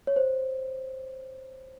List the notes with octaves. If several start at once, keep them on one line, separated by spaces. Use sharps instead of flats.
C#5
C5